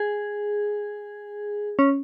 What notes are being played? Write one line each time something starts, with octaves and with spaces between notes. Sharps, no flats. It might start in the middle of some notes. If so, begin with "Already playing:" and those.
Already playing: G#4
C#4